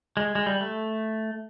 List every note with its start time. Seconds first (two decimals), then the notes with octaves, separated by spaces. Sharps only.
0.17 G#3
0.35 G#3
0.46 G3
0.61 A3